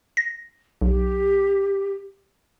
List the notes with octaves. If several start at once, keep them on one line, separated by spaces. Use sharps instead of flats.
A#6
B1 G4